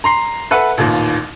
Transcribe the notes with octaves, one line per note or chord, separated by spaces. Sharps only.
A#5 C6 C7
A4 B4 E5 F#5
A1 D#2 A#2 D#3